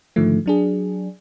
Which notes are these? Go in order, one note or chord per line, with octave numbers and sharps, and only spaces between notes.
G#2 D3 D#3 F3 A3
F#3 D4 G#4